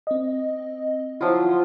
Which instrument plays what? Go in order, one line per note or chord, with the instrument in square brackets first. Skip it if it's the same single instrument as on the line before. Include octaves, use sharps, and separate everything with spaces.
[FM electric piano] C4 D#5
[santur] F3 F#3 F4 [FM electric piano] E4 C6